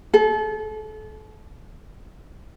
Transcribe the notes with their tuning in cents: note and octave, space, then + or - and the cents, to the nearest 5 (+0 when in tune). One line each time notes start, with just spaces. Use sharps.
A4 -35